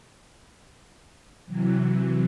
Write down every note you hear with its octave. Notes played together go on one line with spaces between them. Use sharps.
C3 E3 F#3